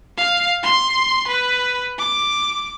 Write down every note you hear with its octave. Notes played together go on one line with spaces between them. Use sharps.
F5
C6
B4
D6